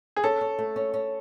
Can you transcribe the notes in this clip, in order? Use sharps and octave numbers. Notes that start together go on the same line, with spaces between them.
G#4
C#4 A4
C#4
A3
C#4
C#4